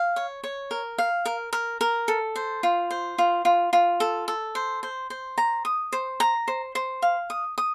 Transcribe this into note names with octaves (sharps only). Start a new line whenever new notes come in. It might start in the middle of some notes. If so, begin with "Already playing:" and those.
Already playing: F5
C#5
C#5
A#4
F5
A#4
A#4
A#4
A4
C5
F4
C5
F4
F4
F4
A4
A4
C5
C5
C5
A#5
D#6
C5
A#5
C5
C5
F5
D#6
D#6